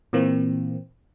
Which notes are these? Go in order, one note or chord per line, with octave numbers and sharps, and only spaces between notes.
A#2 E3 A#3 C4